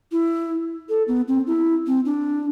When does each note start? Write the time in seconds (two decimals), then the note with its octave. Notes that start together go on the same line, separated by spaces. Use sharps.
0.12 E4
0.89 A4
1.08 B3
1.28 C4
1.47 E4
1.87 C4
2.05 D4